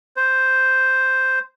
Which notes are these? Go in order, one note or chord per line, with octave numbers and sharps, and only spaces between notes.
C5